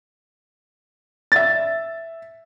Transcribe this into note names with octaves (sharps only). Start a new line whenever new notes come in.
E5 A6